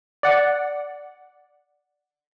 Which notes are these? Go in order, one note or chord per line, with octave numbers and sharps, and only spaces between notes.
D5 F#5